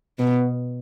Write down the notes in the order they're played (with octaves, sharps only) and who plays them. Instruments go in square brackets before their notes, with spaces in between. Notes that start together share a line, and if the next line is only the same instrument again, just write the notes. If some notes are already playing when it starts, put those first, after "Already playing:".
[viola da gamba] B2 [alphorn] B3